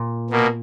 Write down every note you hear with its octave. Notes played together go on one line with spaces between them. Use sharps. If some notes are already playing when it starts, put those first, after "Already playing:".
Already playing: A#2
B2 A#3